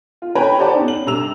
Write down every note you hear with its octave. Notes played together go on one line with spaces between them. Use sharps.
F4
B4 C#5 G5 G#5 A#5 B5
G4 C5 D5 F#5 A5
B3 C#4 D#4
F#7
G2 C3 A#5 E6 F7